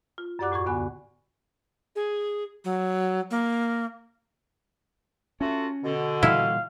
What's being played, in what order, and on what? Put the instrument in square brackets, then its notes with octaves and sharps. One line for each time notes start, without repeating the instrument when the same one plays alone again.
[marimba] F4
F#2 G4 D5 F#5 D6 F#6
E2 A2 F#4 C#6 G#6
D2 D3 B3 G#5 B5 F#6
[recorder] G#4
F#3
A#3
[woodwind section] A3 F4 F#4 [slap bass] C#4
[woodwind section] B2 D3
[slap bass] A#2 E3 G3 [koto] E4 [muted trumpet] F5